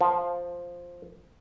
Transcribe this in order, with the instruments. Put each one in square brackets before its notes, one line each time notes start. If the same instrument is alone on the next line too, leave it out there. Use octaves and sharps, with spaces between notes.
[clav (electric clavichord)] F3